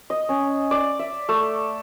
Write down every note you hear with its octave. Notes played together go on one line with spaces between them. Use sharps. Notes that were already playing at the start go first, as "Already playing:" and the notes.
D#5
C#4
D5
E5
A3